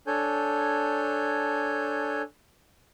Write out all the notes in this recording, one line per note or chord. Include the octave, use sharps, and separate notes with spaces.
D4 A4 C#5 G#5 G6